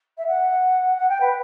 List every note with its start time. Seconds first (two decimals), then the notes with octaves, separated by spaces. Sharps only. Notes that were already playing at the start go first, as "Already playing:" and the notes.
0.17 E5
0.27 F#5
0.97 F#5
1.09 G5
1.20 B4